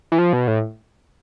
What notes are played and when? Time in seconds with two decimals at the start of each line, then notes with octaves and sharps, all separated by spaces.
0.12 E3
0.18 F3
0.33 B2
0.48 A2